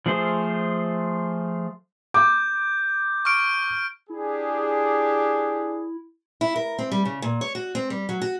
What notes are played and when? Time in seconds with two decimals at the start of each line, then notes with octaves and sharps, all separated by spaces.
0.06 F3 A3 F4 G#4 C5
2.14 D6 G6
3.25 C#6 F6 D7
4.10 D4 E4 G4 G#4
6.41 E4
6.56 A#4
6.79 C4
6.92 G3
7.05 C#3
7.22 A#2
7.41 C#5
7.55 F#4
7.75 C4
7.90 G3
8.09 F#3
8.22 F#4